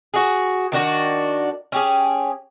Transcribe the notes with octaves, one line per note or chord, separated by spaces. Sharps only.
F#4 G#4
D#3 D4 F#4
C#4 G4 G#4